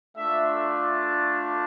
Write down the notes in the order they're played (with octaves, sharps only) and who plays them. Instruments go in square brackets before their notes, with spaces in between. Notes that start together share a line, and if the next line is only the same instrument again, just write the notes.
[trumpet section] A3 D4 F4 E5